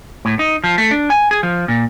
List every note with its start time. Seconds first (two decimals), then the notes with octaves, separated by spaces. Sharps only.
0.25 A2
0.39 D#4
0.64 F3
0.78 A3
0.91 D4
1.10 G#5
1.31 G#4
1.43 F3
1.68 A#2